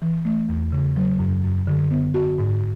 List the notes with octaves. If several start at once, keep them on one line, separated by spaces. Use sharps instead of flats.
E3
A3
E2
C#3
F#3
F#2
F#2
D3
B3
F#4
G#2